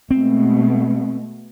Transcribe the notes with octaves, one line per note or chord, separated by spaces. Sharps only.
B2 G#3 A3 C4